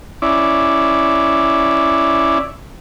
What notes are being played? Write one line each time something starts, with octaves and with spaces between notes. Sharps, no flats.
C#4 E4 D5